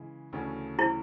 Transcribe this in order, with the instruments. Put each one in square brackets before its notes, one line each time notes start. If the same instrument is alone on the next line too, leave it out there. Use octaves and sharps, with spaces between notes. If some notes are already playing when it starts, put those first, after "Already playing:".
Already playing: [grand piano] C#3 E3 G#3
D2 C#3 E3 A3 C#4
[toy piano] E4